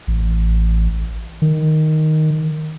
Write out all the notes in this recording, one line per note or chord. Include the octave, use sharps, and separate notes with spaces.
A1
D#3